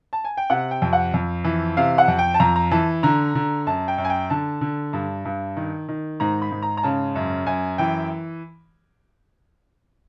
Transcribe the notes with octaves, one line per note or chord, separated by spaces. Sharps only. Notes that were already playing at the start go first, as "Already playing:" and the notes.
A5
G#5
G5
C3 F#5
G5
F2
F#5
F2
E3
C3 F5
F#5
F2
G5
A5
F2 A#5
A#5
E3 A5
D3 A#5
D3
F#2 A5
G5
F#2
G#5
G5
D3 A5
D3
G2
G2
D#3
D#3
G#2 A#5
B5
G#2
A#5
A#5
C#3 A5
F#2
F#2 G#5
E3 G5